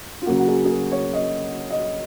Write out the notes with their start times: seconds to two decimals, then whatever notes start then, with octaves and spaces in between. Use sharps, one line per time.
0.22 F4
0.26 C#3 F#3 A#3 F#4
0.39 F#4
0.48 G#4
0.65 G#4
0.70 A#4
0.92 C#5
1.13 D#5
1.70 D#5